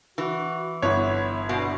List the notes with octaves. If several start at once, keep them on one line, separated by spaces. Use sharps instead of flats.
E3 F#4
G1 B3 E4 C#5
B2 D4